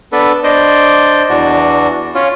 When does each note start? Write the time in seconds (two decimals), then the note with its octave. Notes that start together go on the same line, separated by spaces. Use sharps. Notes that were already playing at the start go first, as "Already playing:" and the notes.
0.12 B3 D4 A4 B4
0.44 D4 C5 D5 D#5
1.29 E2 E3 D4 F#4
2.14 C#4 F4